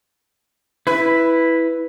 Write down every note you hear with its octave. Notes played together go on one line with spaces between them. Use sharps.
E4 B4